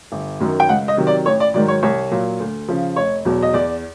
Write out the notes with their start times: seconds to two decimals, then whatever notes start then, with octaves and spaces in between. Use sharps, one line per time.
0.12 G1
0.40 F#2 D#3 F#3
0.60 G5
0.69 C#2 F#5
0.88 D#5
0.97 C3 D#3 F#3
1.07 D5
1.26 A1 C#5
1.40 D5
1.54 G#2 D#3 F#3 D5
1.68 C#5
1.83 C2 C#5
2.11 A#2 F#3
2.40 D2
2.68 C#3 F3
2.96 F1 C#5
3.25 E2 B2 F#3
3.43 D#5
3.53 E2 D5